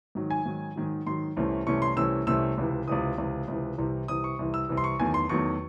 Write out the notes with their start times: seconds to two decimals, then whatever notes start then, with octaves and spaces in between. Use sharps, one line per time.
0.15 G#2 D#3 F#3
0.30 G#5
0.46 G#2 D#3 F#3
0.76 G#2 D#3 F#3
1.06 G#2 D#3 F#3 C6
1.37 C2 C3 E3 A3 C#4
1.66 C2 C3 E3 A3 C#4 C#6
1.82 C6
1.96 C2 C3 E3 A3 C#4 E6
2.27 C2 C3 E3 A3 C#4 E6
2.58 C#2 C3 E3
2.87 C#2 C3 E3 D#6
3.18 C#2 C3 E3
3.48 C#2 C3 E3
3.78 C2 C3 E3
4.08 C2 C3 E3 D#6
4.24 C#6
4.39 C2 C3 E3
4.54 E6
4.69 C2 C3 E3
4.77 C6
4.84 C#6
5.00 E2 D#3 F#3 A3 G#5
5.14 C6
5.29 E2 D#3 F#3 A3 C#6